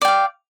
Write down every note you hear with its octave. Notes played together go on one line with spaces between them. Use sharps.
D5 F5 G5